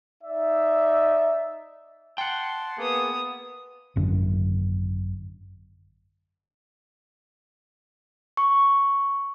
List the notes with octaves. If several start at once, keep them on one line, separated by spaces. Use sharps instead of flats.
D#4 D5 E5
F#5 G5 A5 C6
A#3 B3 G#4 D#6
G#1 F#2 D3
C#6